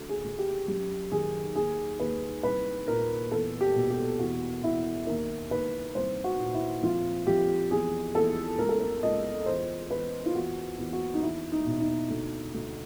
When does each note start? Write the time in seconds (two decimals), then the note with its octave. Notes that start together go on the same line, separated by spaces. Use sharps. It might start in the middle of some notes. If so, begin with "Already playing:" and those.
Already playing: D2
0.09 G#4
0.24 D2
0.39 G4
0.68 F#2 G4
1.12 D#3 G#4
1.55 D#2 G#4
2.00 D#2 B4
2.43 C2 B4
2.88 A#2 A#4
3.32 E2 A4
3.61 G4
3.75 B2
3.90 G4
4.19 E2 F#4
4.63 E2 E4
5.07 D#2 A#4
5.51 D#2 B4
5.95 C2 C5
6.24 F#4
6.39 A#2
6.54 E4
6.83 F2 F4
7.27 F2 G4
7.71 E2 G#4
8.14 E2 A4
8.58 C#2 A#4
8.69 A4
8.80 A#4
9.03 C#2 D#5
9.46 E2 C5
9.90 E2 B4
10.26 F4
10.34 E2 F#4
10.78 E2
10.93 F#4
11.14 D#4
11.22 E2 E4
11.52 D#4
11.66 B2
11.81 D#4
12.10 D2
12.54 D2